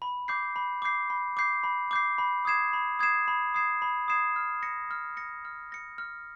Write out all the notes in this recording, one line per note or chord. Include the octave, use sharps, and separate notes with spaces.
B5
D6 G6 C7
B5
D6 G6 C7
B5
D6 G6 C7
B5
D6 G6 C7
B5
D#6 G#6 C7 E7
B5
D#6 G#6 C7 E7
B5
D#6 G#6 C7 E7
B5
D#6 G#6 C7 E7
F6
A#6 C#7
F6
A#6 C#7
F6
A#6 C#7
F6